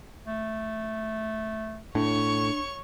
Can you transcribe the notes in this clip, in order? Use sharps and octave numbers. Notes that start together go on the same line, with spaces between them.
A3
A2 D4 C#5 C#6